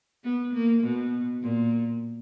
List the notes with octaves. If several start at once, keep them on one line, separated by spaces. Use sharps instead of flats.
B3
A#3
B2
A#2